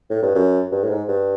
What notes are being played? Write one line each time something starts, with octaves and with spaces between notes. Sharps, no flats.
A2
G2
F#2
G2
A2
G#2
G2